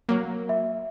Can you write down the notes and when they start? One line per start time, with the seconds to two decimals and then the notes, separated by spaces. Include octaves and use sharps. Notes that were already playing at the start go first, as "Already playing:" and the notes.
0.09 F#3 A#3
0.49 E5